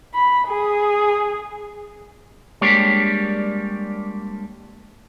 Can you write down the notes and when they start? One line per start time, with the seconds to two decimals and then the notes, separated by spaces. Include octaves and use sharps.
0.15 B5
0.48 G#4
2.61 G3 G#3 A#3 D4 G4 C#5